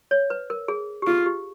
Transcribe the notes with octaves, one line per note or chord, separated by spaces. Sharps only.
C#5
B4
A#4
G#4
G4
F4 G#4
G4